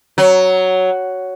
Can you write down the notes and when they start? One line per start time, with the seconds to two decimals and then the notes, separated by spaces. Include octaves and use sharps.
0.18 F#3